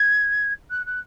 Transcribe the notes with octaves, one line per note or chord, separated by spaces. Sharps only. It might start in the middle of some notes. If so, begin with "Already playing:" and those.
Already playing: G#6
F#6
F#6